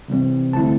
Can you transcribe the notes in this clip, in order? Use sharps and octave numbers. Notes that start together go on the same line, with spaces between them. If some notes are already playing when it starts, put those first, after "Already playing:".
C3 E3 G3 C4
D2 D3 A3 C4 E4 A5